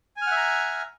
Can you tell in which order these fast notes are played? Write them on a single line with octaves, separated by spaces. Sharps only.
G#5 F6 F#5 E5 A#5